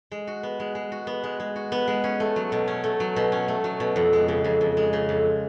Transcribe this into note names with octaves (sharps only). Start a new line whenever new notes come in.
G#3
F#4
B3
G#3
G#3
F#4
B3
G#3
G#3
F#4
B3
G#3
C#4
A3
F#3
B2
C#4
A3
F#3
B2
C#4
A3
F#3
B2
F2
G#3
C#3
F2
F2
G#3
C#3
F2